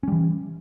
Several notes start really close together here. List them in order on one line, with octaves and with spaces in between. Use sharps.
C#4 G3 E3